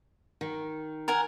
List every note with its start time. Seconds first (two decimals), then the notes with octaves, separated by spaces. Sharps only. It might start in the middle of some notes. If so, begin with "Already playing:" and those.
0.41 D#3
1.08 A#4 F#5 G#5